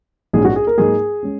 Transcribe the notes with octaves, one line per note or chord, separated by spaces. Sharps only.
A#1 G#2 F#3 C#4 G#4
F#4
G#4
A#4
G#2 F#3 A#3 D#4 G#4
G#3 C#4